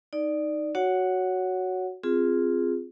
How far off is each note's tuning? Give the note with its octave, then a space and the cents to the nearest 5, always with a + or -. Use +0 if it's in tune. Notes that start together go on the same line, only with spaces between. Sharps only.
D#4 +0 D5 +10
F#4 +0 C#5 +10 F#5 +0
C4 +0 F4 +0 G#4 -5